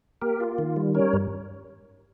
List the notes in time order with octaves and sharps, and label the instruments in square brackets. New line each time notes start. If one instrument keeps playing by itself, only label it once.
[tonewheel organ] A#3 G4 A#4
F4
D#3
G3
C#4 A#4 C#5
G2